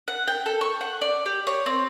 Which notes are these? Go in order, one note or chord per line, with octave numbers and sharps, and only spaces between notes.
F#5
G5
A4
C#6
F#5
D5
G4
C#5
C4